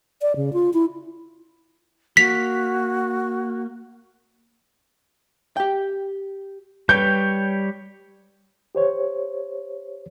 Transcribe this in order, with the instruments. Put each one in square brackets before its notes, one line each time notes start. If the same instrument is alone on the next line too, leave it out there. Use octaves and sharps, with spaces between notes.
[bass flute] D5
C#3
F4
E4
[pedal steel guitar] A#3 [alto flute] F#4 [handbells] B6
[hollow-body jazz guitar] G4 G5
[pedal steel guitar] G3 C#5 G5 [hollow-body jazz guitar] B4 [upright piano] G6
[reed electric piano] G4 C5 C#5